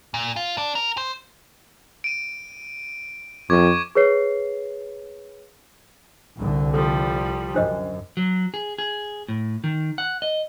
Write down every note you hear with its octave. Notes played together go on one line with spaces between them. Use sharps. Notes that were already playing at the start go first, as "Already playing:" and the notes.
A#2
F4
D4
A#4
C5
D7 D#7
F2 C#6 D6 G#6
G#4 B4 C#5 C7
C2 D3
F3 G3 A4
F#2 D4 C5 D#5
F#3
G#4
G#4
A2
D#3
F#5
D#5